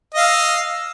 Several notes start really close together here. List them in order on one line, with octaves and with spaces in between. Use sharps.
D#5 F5 E6